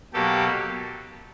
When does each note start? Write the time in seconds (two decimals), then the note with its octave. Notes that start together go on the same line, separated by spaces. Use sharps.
0.13 B2 F#3 A#3 G4 A4